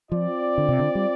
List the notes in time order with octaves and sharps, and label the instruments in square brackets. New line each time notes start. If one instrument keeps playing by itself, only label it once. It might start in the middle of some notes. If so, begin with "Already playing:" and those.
[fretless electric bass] F3 [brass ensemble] C4 F4 D5
[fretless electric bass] D3
C3
D3
G3